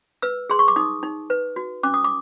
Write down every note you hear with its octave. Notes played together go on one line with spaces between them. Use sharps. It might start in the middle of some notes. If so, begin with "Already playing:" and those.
B4 E6
G#4 C6
C#6
D6
D#4 D#6
D#4
B4
F#4
C#4 D6
D#6
D6